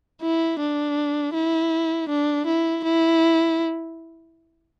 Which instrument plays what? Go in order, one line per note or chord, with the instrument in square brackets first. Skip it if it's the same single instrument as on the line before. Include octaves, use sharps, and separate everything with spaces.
[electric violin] E4
D4
E4
D4
E4
E4